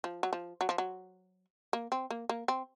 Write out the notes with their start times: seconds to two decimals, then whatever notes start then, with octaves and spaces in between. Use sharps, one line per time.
0.04 F3
0.23 F#3
0.33 F3
0.61 F#3
0.69 F3
0.78 F#3
1.73 A#3
1.92 C4
2.10 A#3
2.29 A#3
2.48 C4